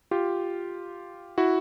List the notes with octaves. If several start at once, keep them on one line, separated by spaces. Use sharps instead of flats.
F4 G4
E4 F#4